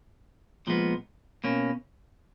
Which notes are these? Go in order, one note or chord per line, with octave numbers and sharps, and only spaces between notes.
A#2 F3 G#3 B3
B2 A#3 C#4